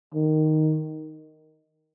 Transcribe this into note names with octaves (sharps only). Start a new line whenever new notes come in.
D#3